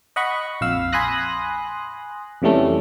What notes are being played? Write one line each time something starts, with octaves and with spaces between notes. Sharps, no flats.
D#5 F#5 B5 C#6
A#1 F2 F5 E6
G#5 B5 C6 D#6 F#6 A#6
F2 C#3 E3 G3 A3 C#4